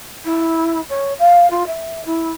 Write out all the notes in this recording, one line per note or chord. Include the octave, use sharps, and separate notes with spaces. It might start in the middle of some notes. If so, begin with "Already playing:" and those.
E4
C#5
F5
F4
E5
E4